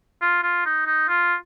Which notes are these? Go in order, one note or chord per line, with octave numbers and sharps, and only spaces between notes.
F4
F4
D#4
D#4
F4